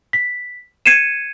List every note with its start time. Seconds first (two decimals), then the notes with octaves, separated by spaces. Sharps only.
0.13 B6
0.86 G#6 C7 C#7 D#7 E7